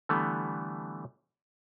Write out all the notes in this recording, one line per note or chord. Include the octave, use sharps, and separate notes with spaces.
D3 E3 G3 A3 B3